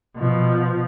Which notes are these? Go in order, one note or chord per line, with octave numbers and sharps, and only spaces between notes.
B2 F3